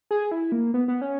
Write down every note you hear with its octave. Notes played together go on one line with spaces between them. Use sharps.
G#4
E4
A#3
B3
B3
C#4